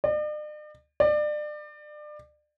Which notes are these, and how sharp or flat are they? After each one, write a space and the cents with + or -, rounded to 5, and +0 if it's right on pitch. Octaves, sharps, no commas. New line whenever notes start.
D5 +45
D5 +30